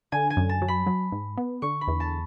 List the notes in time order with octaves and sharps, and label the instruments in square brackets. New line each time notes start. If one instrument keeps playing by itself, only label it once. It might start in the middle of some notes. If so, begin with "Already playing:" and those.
[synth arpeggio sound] D3 [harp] G#5
[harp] G#5
[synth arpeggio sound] F#2
[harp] A5
[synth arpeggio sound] F#3
[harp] B5
[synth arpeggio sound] F#3
G#2
B3
[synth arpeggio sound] D3 [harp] C#6
[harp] B5
[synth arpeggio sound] E2
[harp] A5